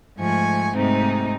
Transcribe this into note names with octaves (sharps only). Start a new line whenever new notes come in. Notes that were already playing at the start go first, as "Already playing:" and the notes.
G#2 F3 A3 G#5 C#6
G#2 C3 A3 C4 D#4